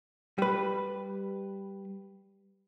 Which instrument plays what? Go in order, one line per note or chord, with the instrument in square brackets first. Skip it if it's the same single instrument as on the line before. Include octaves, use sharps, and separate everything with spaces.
[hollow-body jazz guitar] G3 B4